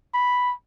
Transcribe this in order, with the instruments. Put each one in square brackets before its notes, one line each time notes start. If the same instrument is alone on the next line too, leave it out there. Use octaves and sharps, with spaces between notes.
[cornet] B5